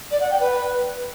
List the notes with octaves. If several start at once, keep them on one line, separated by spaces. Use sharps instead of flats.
D5
F#5
G5
B4